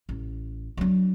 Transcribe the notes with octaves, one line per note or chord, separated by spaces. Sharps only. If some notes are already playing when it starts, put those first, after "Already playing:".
A1
F#3 D4